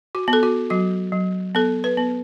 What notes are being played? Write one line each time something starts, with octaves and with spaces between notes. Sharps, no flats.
F#4
B3
A4
F#4
F#3 F#4
F#3
B3 A4
B4
B3